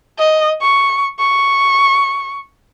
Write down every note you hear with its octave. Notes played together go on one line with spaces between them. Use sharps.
D#5
C#6
C#6